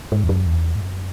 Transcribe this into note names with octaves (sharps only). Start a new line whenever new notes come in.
G#2
E2
F#2
E2
G#2
F#2